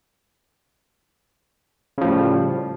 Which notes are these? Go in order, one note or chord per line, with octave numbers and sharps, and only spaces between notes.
A2 C#3 F3 G3